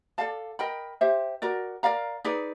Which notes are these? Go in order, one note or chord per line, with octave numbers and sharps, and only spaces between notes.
A4 D5 F5 A5
A#4 D#5 G5 B5
G4 C5 E5
F#4 A#4 D5
A#4 D5 F5 A#5
D#4 G#4 B4 D5